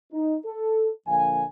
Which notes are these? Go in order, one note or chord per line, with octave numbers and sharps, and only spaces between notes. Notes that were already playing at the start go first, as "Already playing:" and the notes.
D#4
A4
A#1 D3 F3 A#3 F5 G#5